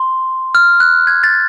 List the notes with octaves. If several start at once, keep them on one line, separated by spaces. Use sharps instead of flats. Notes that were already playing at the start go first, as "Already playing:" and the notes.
Already playing: C6
F6
F#6
G#6
A6